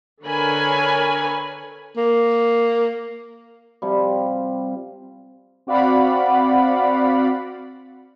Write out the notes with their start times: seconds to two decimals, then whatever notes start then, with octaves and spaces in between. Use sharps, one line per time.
0.24 D3 A#4 B4 C#5 G#5 B5
1.97 A#3
3.82 C3 F3 G3
5.67 C4 F#4 D5 F5 F#5 B5